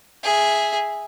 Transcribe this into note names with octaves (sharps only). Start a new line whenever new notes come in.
G#4 E5